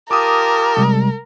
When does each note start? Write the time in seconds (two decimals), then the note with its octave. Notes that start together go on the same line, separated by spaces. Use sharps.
0.11 F4 G4 A#4 A5 D6 D#6
0.77 C3 G3 G#3